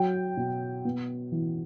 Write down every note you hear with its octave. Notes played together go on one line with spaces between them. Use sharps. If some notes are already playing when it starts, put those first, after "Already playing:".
Already playing: F#3 G5
B2
B3
E3